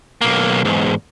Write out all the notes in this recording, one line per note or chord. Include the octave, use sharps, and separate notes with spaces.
B1 A#3
E2 G#2